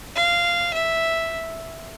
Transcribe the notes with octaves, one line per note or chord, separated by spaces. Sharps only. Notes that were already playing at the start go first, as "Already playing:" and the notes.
F5
E5